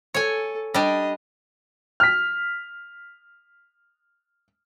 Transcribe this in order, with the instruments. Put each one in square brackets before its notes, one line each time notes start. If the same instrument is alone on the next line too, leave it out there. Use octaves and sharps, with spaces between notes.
[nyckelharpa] A4 [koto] C#5 G#5
[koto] G3 D4 [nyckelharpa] D#5
[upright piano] F6 B6